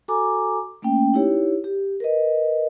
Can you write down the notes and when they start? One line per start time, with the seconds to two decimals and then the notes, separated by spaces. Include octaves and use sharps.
0.08 F#4 A4 G#5 A#5 D6
0.82 A3 A#3 C#4 G5
1.14 D#4 E4 G4 C#5
1.64 G4
2.00 A#4 B4 D#5